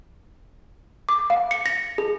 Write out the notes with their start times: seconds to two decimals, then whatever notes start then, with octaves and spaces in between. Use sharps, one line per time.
1.09 D6
1.30 F5
1.51 C#7
1.66 A#6
1.98 G#4